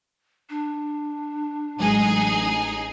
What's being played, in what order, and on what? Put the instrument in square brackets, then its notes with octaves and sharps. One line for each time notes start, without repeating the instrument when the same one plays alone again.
[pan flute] D4
[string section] A1 D#4 G#4 [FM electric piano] F#3 G#3